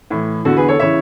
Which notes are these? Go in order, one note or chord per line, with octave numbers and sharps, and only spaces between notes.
A2 E3
E2 D3 F#4 A4
G#4 B4
A4 C#5
C#3 E3 C#5 E5